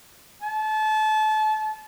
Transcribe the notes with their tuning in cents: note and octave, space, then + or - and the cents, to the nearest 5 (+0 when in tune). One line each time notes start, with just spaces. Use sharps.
A5 -30